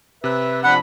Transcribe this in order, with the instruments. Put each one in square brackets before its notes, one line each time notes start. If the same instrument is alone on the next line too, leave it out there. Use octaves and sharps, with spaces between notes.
[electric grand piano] C3 F#6 [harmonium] B4 E5
[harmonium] F3 D4 [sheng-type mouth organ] F#5 [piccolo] B5